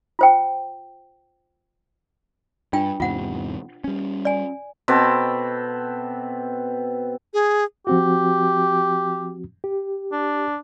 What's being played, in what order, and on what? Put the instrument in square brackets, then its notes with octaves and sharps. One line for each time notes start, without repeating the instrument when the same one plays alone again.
[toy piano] F4 C5 G5
[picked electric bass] G2 [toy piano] D4 F4 G5
[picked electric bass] E2 G#2 C3 [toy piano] F4 F#5
[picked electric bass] G3 C#4
[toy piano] D5 G#5
[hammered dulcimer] B2 C4 A4 D6
[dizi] G#4
[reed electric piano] F3 C4 F#4 [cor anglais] G4
[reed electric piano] G4
[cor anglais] D4